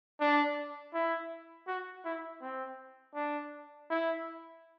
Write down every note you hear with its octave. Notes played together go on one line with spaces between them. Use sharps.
D4
E4
F#4
E4
C4
D4
E4